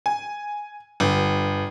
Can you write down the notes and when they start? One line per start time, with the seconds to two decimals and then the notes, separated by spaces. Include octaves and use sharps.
0.06 G#5
1.00 G1